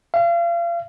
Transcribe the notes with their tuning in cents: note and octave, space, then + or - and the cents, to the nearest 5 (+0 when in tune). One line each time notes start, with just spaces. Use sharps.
F5 -35